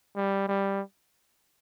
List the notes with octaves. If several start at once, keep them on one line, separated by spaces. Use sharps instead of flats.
G3
G3